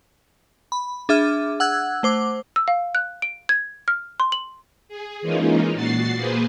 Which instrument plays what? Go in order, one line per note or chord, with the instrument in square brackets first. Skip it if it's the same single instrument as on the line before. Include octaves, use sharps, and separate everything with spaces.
[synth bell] B5
D4 G#4 E5 D6 F6
F#5 E6 F#6 G#6
A3 C5 D6
[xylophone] E6
F5
F#6
D7
G#6
F6
C6
F#7
[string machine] G#4
E3 G#3 A#3 C#4 D#4 F4
A#2 F#4 A6 C7
A#3 G#4 B4 C5